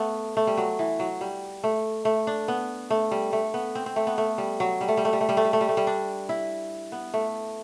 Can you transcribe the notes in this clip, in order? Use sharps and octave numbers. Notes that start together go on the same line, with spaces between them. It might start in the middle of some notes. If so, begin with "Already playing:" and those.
Already playing: A3 B3
A3
G3
F#3
E3
F#3
G3
A3
A3
D4
B3
A3
G3
A3
B3
C4
C4
A3
B3
A3
G3
F#3
G3
A3
G3
A3
G3
A3
G3
A3
G3
A3
G3
A3
G3
D4
E4
B3
A3